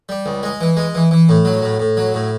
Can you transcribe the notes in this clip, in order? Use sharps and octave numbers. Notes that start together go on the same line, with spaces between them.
G3
C#2
G#3
E3
G#3
E3
E3
A2
F#3
A2
A2
F#3
A2